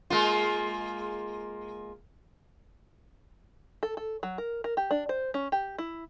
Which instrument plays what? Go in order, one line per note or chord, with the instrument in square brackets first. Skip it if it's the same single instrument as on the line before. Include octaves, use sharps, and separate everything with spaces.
[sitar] G#3 A#3 F4
[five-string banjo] A4
A4
F#3
A#4
A#4
G4
D4
C5
C#4
G4
E4